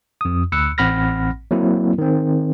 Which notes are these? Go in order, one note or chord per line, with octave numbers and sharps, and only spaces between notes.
F2 D#6
D2 B5 E6 F#6 C#7
A1 C4 F#5 B5 F6 A#6
F#3 A#3 C4 E4
D#3 C4